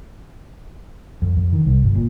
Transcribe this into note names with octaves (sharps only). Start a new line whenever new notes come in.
F2
F2
D#3
C2
G1
A#2